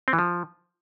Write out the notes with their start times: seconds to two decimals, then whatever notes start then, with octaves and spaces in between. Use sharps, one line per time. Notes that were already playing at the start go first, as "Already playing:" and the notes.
0.08 C4
0.13 E3
0.19 F3